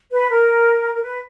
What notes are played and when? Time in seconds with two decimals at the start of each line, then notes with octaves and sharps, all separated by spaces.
0.11 B4
0.30 A#4
0.94 A#4
1.02 B4